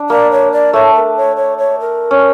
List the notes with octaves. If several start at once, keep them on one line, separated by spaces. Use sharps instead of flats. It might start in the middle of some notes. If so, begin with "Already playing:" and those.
Already playing: D4
A#3 D5
C#5
D5
A3 C#5
A#4
C#5
C#5
C#5
A#4
C#4